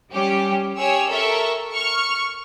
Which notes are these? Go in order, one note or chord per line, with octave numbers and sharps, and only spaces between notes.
G3 C#4 G4
G4 G#4 C#5 E6
A4 A#4 E5 C#6
C#6 F6 C#7